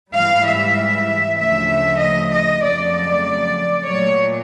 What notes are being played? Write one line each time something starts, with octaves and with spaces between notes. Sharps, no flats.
G#2 E3 G3 F5
E5
D2 C#3 F3 A3 E5
D#5
D#5
F2 C#3 F#3 A3 D5
A#2 F#3 A3 C#5